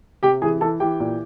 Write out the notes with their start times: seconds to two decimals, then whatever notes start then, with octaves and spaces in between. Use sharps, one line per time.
0.23 C3 G4 G5
0.42 E3 G#4 G#5
0.61 E3 A4 A5
0.80 E3 G4 G5
1.00 A#2